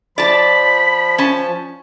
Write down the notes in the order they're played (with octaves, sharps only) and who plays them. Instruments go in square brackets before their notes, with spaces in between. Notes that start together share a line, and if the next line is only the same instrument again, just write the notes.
[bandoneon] F3 [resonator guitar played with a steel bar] D5 A5 [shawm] B5
[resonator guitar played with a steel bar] C#4 A5